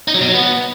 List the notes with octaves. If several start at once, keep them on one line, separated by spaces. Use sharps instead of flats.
D#4
F#3
B2
F#3
B3